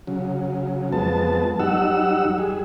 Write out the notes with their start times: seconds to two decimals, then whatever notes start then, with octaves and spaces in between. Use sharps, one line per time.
0.07 C#3 F#3
0.92 F2 G#3 B3 A5
1.60 F#2 G3 D#4 F#5 E6
2.38 G3 G#4